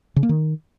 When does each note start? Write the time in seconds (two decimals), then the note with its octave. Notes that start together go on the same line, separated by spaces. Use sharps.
0.16 C#3
0.23 A#3
0.29 D#3